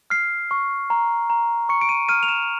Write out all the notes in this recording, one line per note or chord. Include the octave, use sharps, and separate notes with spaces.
F6 C7
C#6
A#5
A#5
C#6 C#7
D7
D#7
F6 D#7
F7
E7